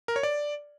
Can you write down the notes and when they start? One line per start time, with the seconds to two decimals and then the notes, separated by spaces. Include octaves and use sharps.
0.08 A#4
0.16 C#5
0.23 D5